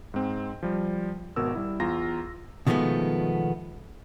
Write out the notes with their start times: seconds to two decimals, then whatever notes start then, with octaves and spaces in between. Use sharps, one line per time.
0.14 G#2 C4
0.63 F3 G3
1.36 G#1 B2 A#4 E6
1.55 G3 E4
1.80 E2 F4 A#5 A#6
2.67 B2 D#3 F3 G#3 A3 B3